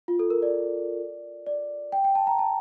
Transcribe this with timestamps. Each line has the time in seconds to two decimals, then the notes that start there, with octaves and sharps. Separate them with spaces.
0.08 F4
0.19 A4
0.30 A#4
0.42 D5
1.47 D5
1.92 G5
2.04 G5
2.15 A5
2.27 A#5
2.39 A5